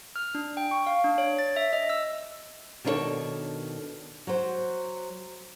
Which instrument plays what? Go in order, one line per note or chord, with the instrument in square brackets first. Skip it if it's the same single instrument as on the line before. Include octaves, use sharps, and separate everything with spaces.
[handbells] F6
D4
G5
C#6
F5
D4
C#5
A6
E5
D#5
E6
[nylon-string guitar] B2 D#3 D4 E4 A4 C#5
F#3 C5